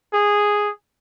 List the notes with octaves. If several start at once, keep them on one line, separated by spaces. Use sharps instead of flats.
G#4